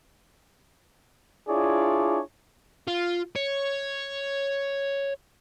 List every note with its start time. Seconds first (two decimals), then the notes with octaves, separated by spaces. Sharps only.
1.48 D4 E4 F4 G#4 C#5 D5
2.88 F4
3.36 C#5